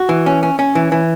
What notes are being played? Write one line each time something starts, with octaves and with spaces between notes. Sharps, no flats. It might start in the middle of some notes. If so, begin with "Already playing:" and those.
Already playing: F#4
E3
C#4
C#4
C#4
E3
E3